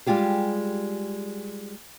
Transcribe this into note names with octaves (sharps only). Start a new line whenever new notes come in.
G3 G#3 F4 G4 G#4